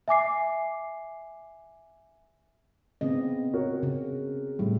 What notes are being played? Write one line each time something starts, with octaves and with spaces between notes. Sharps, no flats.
E5 G#5 D6 C7
C#3 B3 C4 D#5
F#4 A#4 C#5
C#3
A2 G3